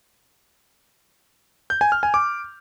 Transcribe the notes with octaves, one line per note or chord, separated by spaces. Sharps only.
G6
G#5
F6
G#5
D6